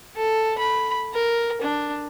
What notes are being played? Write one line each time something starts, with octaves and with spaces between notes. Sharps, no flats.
A4
B5
A#4
D4